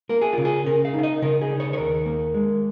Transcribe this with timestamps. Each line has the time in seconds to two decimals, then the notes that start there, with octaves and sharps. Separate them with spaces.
0.09 A#3 A#4
0.22 G#4
0.33 C#3 F4
0.45 G#4
0.66 C#3 A#4
0.85 F5
0.94 D#4
0.99 F5
1.03 D#5
1.22 C#3 A#4
1.41 G#4
1.51 D#4
1.60 C#5
1.73 C#5
1.78 D#2 A#4
2.06 A#3
2.34 G#3